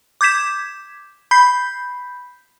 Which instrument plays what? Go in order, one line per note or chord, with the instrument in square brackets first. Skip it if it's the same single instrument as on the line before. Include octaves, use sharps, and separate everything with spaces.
[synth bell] D6 G6 G#6 B6 E7
B5 G6 B6 C7